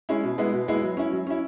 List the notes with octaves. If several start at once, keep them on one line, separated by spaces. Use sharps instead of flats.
G#3 C#4 E4
B2
G#3 B3 E4
B2
G#3 B3 E4
F#3
C#4 E4
F#3
C#4 E4